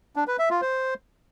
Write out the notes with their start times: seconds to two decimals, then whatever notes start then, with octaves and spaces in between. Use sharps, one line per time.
0.16 D4
0.27 B4
0.39 E5
0.50 F4
0.62 C5